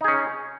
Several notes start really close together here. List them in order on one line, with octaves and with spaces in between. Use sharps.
D#4 G#4 C#4